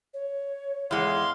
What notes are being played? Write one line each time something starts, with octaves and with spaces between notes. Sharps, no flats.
C#5
E2 G#3 F5 C6